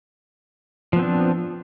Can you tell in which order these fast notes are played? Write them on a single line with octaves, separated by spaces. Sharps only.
F3 B3 C4 D4